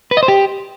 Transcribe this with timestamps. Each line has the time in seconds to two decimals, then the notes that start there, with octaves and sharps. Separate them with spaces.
0.11 B4
0.17 D#5
0.23 C5
0.28 G4